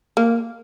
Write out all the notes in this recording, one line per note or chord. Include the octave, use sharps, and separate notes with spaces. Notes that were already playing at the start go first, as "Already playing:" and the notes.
A#3